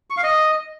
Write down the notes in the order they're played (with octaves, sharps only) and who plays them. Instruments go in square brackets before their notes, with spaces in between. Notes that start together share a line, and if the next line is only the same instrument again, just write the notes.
[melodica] C#6
F5
D#5